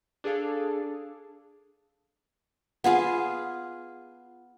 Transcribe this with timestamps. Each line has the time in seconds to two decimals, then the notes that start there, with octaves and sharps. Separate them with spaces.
0.24 D4 G#4 A4 F5
2.84 B3 F4 G#4 F5